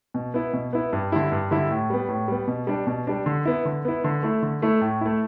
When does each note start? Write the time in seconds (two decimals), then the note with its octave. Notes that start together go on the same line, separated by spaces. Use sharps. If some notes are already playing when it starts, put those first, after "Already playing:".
0.14 B2
0.34 B3 E4
0.53 B2
0.73 B3 E4
0.93 G2
1.12 D3 G3 E4
1.32 G2
1.51 D3 G3 E4
1.71 A2
1.90 G3 B3
2.09 A2
2.28 G3 B3
2.48 B2
2.67 G3 D4
2.87 B2
3.07 G3 D4
3.26 D3
3.45 B3 E4
3.65 D3
3.85 B3 E4
4.04 D3
4.23 A3 E4
4.43 D3
4.62 A3 E4
4.81 A2
5.01 A3 E4